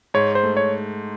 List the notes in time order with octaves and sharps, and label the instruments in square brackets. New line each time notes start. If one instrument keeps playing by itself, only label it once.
[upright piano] G#2 [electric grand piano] C#5
[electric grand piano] C5
[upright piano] A3
[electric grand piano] C#5